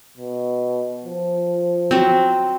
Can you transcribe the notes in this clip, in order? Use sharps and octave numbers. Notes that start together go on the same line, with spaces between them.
B2
F3
F#3 C4